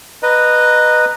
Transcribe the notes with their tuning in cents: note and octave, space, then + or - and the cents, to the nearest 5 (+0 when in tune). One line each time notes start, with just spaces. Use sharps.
B4 +0 D#5 -20 A#5 +0